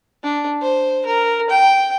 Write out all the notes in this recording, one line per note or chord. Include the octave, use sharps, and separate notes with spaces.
D4
C5
A#4
G5